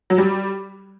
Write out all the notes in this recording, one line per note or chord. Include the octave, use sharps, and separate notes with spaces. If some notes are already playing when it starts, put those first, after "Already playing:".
F#3
G3